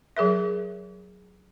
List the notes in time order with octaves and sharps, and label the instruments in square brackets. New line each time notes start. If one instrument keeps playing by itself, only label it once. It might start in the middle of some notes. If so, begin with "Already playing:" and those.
[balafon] F#3 G#4 A#4 E5